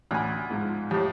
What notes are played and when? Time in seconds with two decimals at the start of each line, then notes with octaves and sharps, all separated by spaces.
0.11 A1 D2 G#5 B5
0.50 G#2 F3
0.91 F2 A2 G4